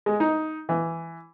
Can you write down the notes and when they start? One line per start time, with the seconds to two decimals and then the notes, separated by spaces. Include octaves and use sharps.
0.06 G#3
0.20 D#4
0.69 E3